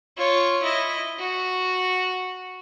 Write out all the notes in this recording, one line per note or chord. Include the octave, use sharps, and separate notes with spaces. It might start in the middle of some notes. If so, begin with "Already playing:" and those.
F4 C#5
E4 D#5
F#4